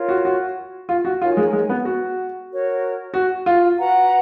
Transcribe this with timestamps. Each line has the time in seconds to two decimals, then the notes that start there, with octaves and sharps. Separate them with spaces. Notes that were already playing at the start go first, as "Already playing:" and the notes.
Already playing: F4 A#4 C#5
0.08 F#4
0.25 F#4
0.89 F4
1.05 F#4
1.21 D#4 F4 A#4 C#5 G#5
1.37 G#3
1.53 G#3
1.69 B3
1.85 F#4
2.50 F#4 A#4 C#5
3.14 F#4
3.46 F4
3.79 F#4 B4 F#5 A#5